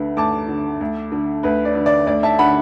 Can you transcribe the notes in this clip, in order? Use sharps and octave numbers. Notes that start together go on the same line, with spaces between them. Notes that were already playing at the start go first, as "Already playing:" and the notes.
Already playing: D2 D3 B4
D2 A5 D6
D3
D2
D3
D2 B4
D5
D3
D5
D2 D5
E5 A5
D3 F#5 B5